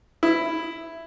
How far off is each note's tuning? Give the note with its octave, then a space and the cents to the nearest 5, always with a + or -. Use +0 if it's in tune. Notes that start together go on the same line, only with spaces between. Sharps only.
E4 +5